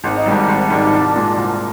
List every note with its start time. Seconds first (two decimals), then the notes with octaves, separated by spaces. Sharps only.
0.03 G#1 D4
0.17 D#4
0.26 G#2 D#3 G3 D4
0.48 G#1
0.70 G#2 D#3 G3
0.93 C2
1.16 A#2 G#3
1.37 C2